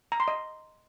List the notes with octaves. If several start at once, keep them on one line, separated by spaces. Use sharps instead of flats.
A#5
C6
D#5